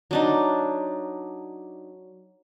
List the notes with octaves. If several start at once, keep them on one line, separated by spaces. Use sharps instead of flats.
F#3 D4 D#4